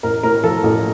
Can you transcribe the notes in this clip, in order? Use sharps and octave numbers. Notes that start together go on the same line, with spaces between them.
A1 A#4
A2 A#4
F3 A4
A1 A4